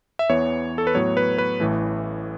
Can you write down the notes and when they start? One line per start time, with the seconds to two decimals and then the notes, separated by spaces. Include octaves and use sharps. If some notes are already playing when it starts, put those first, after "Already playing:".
0.19 E5
0.29 E2 E3 B3 C#5
0.78 A4
0.87 B4
0.95 A2 F#3 B3 C#5
1.17 B4
1.38 B4
1.60 A1 A2 E3 A3